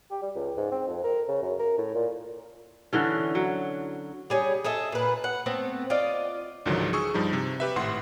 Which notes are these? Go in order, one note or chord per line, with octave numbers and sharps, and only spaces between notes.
G4
G3
C#2
G#2
C4
F2
A#4
C#3
F#2
A#4
A2
A#2
D3 E3 C#4
F#3
G3 G#4 C#5
G#4 A4 D#5 E5
A#2 B4
F#5
A3 B3 C4
F4 D5 D#5
C#2 G#2 D3 D#3 F3 F#3
G#4 C#6 E6
G2 F3 G3 D#4
C3
G4 B4 E5
G#1 A2 F#5 C6